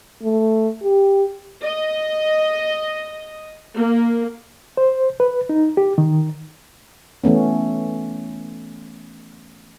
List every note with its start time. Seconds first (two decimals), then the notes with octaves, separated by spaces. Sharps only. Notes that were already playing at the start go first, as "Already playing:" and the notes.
0.23 A3
0.83 G4
1.63 D#5
3.76 A#3
4.77 C5
5.20 B4
5.49 D#4
5.77 G4
5.98 D#3
7.24 E3 A3 B3 C#4